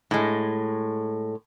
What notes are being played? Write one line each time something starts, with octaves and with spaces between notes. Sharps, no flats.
A2 G#3